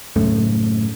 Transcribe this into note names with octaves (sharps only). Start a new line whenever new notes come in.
F#2 A2 C#3 A3